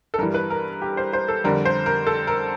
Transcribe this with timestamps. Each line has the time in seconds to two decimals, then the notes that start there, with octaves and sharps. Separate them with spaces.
0.14 A4
0.19 G2 E3 G3 A#4
0.34 B4
0.50 A#4
0.82 G4
0.97 C5
1.13 C5
1.28 A4
1.44 F2 D3 G3 A#4
1.65 C5
1.86 A#4
2.07 A4
2.27 A#4